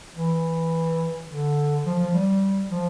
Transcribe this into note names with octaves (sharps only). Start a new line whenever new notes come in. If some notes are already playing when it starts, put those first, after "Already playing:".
E3
D3
F3
F3
G3
F3